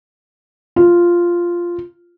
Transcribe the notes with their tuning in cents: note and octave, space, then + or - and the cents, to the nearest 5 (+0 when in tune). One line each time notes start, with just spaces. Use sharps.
F4 -5